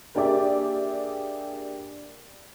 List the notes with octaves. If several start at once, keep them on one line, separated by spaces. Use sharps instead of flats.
A#3 D4 G4 G#4 D5 E5